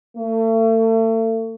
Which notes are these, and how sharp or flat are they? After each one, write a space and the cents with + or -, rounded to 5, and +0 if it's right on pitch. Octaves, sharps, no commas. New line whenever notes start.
A3 +35